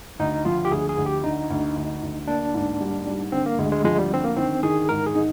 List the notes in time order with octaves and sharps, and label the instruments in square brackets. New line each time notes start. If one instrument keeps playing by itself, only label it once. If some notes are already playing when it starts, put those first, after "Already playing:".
[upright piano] D2 [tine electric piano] D#4
[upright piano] F3 [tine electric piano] F4
[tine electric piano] G4
[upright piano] D2 [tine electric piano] G#4
[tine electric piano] G#4
[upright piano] D2
[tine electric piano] G4
[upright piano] D3 [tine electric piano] D#4
[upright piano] D2
D2
D2
[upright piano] A#3 [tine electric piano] D4
[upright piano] G#2
G3
G3
[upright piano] D3 [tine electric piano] C4
[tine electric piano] A#3
[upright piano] D2 [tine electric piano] G#3
[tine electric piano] G#3
[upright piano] F3 [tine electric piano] G#3
[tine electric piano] G3
[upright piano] D3 [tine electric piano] C4
[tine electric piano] A#3
[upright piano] D#3 [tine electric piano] C4
[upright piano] D#3 [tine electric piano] G#4
[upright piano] G#2 [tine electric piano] A#4
[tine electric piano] G#4
[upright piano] D#4